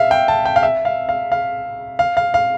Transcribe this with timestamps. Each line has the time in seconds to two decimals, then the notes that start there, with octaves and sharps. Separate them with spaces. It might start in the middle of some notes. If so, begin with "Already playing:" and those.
Already playing: E5 F5
0.11 G5
0.28 A5
0.46 G5
0.56 F5
0.63 E5
0.85 F5
1.09 F5
1.32 F5
1.99 F5
2.17 F5
2.34 F5